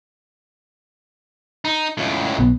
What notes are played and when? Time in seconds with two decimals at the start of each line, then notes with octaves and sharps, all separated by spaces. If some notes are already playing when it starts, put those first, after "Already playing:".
1.65 D#4
1.98 C#2 A2
2.39 B1 B3